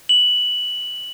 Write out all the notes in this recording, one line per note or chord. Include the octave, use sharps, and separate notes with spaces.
F#7